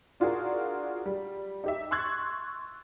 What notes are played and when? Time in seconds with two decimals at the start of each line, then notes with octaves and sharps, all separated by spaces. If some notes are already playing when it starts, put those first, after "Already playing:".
0.20 D4 F4 F#4 G#4 A#4
1.06 G3
1.64 D#4 G4 E5
1.91 C6 C#6 E6 F#6 G#6 A6